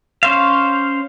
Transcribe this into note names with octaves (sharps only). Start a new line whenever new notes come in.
C#4 C5 F5